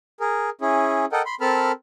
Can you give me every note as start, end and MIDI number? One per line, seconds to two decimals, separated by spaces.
0.20 0.50 68
0.20 0.50 70
0.61 1.05 61
0.61 1.05 64
0.61 1.05 68
1.12 1.22 69
1.12 1.22 70
1.12 1.22 75
1.12 1.22 78
1.12 1.22 79
1.26 1.35 83
1.26 1.35 84
1.41 1.72 60
1.41 1.72 69
1.41 1.72 70
1.41 1.72 81
1.41 1.72 83
1.41 1.72 89